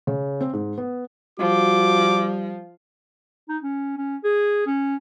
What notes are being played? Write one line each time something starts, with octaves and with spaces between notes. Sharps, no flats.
C#3
C4
G#2
B3
F3 G3 F#4 D6
D#4
C#4
C#4
G#4
C#4